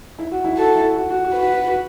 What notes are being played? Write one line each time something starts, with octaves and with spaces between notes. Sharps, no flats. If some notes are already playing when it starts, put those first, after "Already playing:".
E4
F#4
E4
F#4 A4
E4
F#4
F#4
F#4
B4
F#4
F#4
F#4